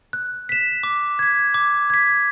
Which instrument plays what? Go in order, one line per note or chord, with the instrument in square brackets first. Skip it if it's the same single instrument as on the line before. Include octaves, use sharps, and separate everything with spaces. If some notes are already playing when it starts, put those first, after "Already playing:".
[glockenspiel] F#6
B6 E7
D6
G#6 B6
D6
G#6 B6